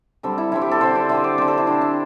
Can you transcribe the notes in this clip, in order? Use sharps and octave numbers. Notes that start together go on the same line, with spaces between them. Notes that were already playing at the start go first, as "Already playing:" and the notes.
D3 G3 C4 A4
E4
D3 G3 C4 E4
G4
A4
D3 C4 C5
D5
D3 C4 E5
D5
D3 C4 C5
A4
E4
D3 C4 D4
D4